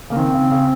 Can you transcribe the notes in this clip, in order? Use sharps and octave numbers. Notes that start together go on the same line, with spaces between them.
C#3 A#3
D#3 C4
C#3
C#3